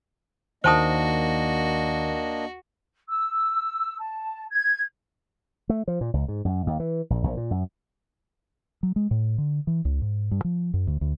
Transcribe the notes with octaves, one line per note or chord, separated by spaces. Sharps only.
D#2 A#3 D4 F#4 C5 D#5 A5 D#6
E6
A5
G#6
A3
F3
A#2
C#2
G#2
F#2
D#2
E3
A#1
A#1
A#2
F#2
F#3
G#3
A2
D3
E3
C#2
G#2
G2
F3
F#2
D2
D2